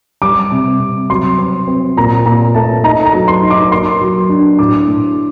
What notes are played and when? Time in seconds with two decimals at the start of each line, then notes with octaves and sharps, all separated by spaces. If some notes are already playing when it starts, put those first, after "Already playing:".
0.22 G3 D6
0.51 C3
0.80 C3
1.10 F#3 C6
1.38 C4
1.67 C4
1.97 A#2 A#5
2.26 A#2 A#5
2.54 A3 A5
2.84 D#4 A#5
3.06 A#5
3.13 F#3
3.28 C6
3.42 D#4
3.50 D6
3.71 A#3 C6
4.01 F#3
4.29 D4
4.59 A2 D6
4.88 A2